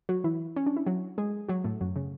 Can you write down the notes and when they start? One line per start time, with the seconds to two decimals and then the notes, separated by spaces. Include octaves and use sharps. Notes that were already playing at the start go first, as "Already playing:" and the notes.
0.09 F#3 F#4
0.24 E3 E4
0.56 C#4
0.66 D4
0.77 E4
0.86 F#3 F#4
1.18 G#3 G#4
1.49 F#3 F#4
1.64 A2 A3
1.81 F#2 F#3
1.96 C#3